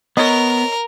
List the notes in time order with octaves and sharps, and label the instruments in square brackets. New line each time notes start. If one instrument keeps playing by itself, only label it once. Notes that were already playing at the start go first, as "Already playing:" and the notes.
[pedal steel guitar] B3 [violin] A#4 [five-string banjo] C#5 D#5